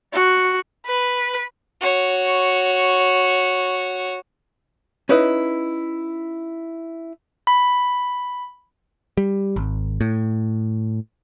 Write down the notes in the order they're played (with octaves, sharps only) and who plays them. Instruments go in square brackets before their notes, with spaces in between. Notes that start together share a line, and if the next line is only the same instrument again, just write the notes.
[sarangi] F#4
[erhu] B4
[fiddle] F#4 C#5
[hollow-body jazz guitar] C#4 D#4 E4 B4 D#5
[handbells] B5
[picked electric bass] G3
G#1
A2